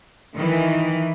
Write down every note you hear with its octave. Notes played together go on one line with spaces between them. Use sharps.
D#3 E3